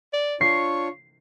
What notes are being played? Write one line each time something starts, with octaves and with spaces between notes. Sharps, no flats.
D5
D4 F4 C#5 C#6 C7